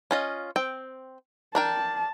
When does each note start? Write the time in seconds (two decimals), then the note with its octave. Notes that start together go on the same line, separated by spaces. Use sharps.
0.11 C#4 F4 D#5
0.56 C4 G5
1.55 D4 A#4 G5 A5